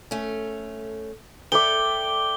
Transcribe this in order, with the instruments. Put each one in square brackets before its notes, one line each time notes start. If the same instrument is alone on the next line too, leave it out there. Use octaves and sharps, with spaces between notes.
[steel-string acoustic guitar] A3 C#4
[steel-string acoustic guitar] A4 [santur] D5 E5 G5 [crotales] G7